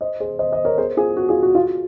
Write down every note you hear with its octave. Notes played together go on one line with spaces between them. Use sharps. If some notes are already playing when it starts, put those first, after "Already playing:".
C5 D#5
G#4 C5
C5 D#5
C5 D#5
A#4 C#5
G#4 C5
F4 G#4
F#4
F4 G#4
F#4
F4